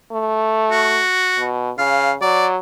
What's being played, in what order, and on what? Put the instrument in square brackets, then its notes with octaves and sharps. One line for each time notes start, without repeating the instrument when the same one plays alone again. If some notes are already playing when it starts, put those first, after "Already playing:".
[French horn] A3
[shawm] F#4
[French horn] B2
[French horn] C#3 [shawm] F5
[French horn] F#3 [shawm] D5